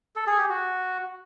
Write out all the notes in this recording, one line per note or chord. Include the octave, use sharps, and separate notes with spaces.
A4
G#4
G4
F#4